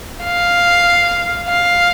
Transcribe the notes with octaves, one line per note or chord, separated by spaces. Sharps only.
F5
F5